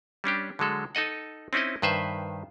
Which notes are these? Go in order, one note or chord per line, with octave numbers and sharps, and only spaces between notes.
G3 C#4 D4 G4
D3 F#3 G#3 A4
D#4 A4 D#5 F#5
C4 C#4 D#4 E4 D#5
G2 D#3 B4 C5 E5